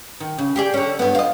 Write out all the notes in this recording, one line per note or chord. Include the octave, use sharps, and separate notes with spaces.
D#3
C#3
G4 G#4 D5
D3 C#4
G2 B3
F4 D#5